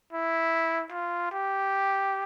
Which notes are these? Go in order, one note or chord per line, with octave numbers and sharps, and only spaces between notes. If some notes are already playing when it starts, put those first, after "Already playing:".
E4
F4
G4